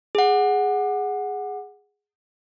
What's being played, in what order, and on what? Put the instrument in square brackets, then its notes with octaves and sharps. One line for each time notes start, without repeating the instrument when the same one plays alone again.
[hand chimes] G#4 F#5